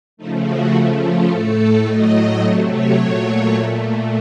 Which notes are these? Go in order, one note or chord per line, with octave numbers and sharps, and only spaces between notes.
C#3 F3 A3 D#4
F#4
C#3 F3 A3 F4
F4
A2 A3 A4
A2 F#3 A3 D#5
C3 F#3 A3 F#5
C#5
A#2 F#3 A3
A#2 A3